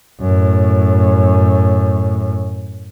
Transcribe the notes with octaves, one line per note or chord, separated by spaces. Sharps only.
F#2 A2